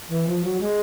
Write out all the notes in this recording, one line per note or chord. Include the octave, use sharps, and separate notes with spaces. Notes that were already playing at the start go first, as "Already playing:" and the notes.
E3
F3
F#3
G#3